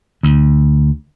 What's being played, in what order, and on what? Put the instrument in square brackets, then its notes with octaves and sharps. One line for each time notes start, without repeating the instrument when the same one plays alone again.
[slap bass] D2